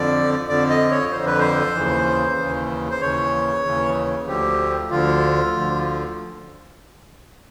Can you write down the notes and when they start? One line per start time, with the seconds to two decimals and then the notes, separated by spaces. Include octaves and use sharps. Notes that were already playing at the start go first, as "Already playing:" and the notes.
Already playing: F2 D3 F3 D5
0.49 F2 D3 F3 D5
0.70 D#5
0.91 C#5
1.11 F2 D3 F3 C5
1.26 B4
1.39 C5
1.75 D#2 C#3 E3
2.38 D#2 C#3 E3
2.90 C5
3.01 D#2 C#3 E3 C#5
3.65 D#2 C#3 E3
4.27 D2 D3 F3 G4
4.90 D2 D3 F3 F4
5.54 D2 D3 F3